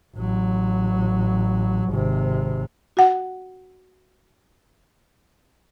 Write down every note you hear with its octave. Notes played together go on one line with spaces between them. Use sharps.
A1 F#3
G#1 C3
F#4 F#5